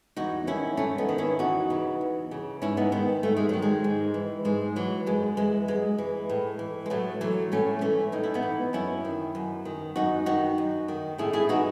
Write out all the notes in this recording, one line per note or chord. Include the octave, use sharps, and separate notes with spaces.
E2 D#4 F#4
D#3 C#4 E4
E2 A3 C#4
B3 D#4
D#3
C#4 E4
E2 D#4 F#4
C#3 E3
E2
C#3 E3
G#2 C#4 E4
B3 D#4
D#3 G#3 B3
G#2 A3
G#3
D#3 F#3
G#3
G#2
E3
G#2 G#3
E3 F#3
F#2 G#3
E3 G#3
F#2 G#3
E3
A2
E3
G#3
A2 F#3 A3
E3 F#3 A3
A2 A3 C#4
E3 A3 C#4
A2 D#4
E4
B3 D#4
E3
F#2 C#4 E4
D#3
F#2
D#3
F#2 D#4 F#4
D#3 D#4 F#4
F#2
D#3
A2 E4 G#4
E4 G#4
E3 D#4 F#4